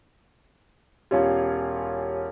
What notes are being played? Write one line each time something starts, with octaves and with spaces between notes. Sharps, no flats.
E1 C#4 F4 G4 C#5 F5